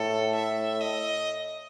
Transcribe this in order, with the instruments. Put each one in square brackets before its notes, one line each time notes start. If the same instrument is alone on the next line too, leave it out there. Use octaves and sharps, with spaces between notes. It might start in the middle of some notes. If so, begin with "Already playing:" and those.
Already playing: [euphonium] A2 [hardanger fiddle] A4
[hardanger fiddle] E5
D#5